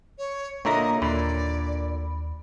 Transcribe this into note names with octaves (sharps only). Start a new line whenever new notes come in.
C#5
A#2 D3 A#3 E4 C#5 D#5 A#5 A#6
D#2 A#2 D3 D5 B5